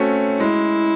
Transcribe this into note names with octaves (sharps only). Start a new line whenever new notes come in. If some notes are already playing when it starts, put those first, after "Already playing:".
Already playing: A3 C4 C#4 F#4
G#3 E4